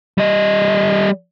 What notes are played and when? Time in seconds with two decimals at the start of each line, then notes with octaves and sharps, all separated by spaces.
0.18 G3 D#5